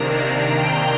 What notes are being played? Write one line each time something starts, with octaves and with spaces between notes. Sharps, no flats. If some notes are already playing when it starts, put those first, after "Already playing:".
Already playing: C3 D#3 A#3 D4 A#5
G5